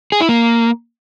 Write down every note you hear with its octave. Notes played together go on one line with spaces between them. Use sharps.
G#4
E4
A#3